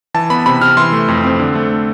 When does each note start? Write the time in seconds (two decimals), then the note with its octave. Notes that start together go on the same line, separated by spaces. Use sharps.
0.14 E3 A5
0.30 B3 B5
0.46 C3 B5
0.61 C3 F6
0.77 E3 C6
0.92 A3
1.08 F2
1.24 C4
1.39 D3
1.55 A3